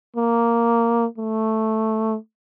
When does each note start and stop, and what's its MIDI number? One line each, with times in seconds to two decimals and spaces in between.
0.16 1.06 58
1.18 2.16 57